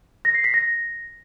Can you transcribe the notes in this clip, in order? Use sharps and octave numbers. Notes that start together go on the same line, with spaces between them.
A#6
C7
B6
A#6